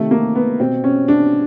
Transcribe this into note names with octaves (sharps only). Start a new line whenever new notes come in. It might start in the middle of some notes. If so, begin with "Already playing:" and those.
Already playing: C3 D#3 A3
A#3
B3
B2 C4
C#4
D4